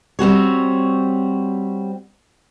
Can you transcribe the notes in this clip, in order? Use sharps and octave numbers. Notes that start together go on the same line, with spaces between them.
G3 C4 F#4 C#5